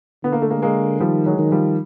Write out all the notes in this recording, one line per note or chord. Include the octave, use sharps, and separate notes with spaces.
D3 B3
A#3
A3
G#3 A#3
G#3 A#3
D#3 F3 G3
F#3 G#3
D#3
F3 G3